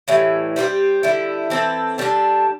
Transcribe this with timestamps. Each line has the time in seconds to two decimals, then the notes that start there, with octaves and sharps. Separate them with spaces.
0.08 A2 E3 G3
0.56 G3 C4 E4 G4
1.03 D3 G3 E4
1.50 E3 C4 A4
1.98 D3 G3 D4 A4